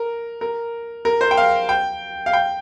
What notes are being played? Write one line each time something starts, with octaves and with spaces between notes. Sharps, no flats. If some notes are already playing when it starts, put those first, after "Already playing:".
Already playing: A#4
A#4
A#4
C5
G5
F5
G5
F5
G5